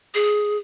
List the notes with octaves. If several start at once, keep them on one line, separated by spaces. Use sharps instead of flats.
G#4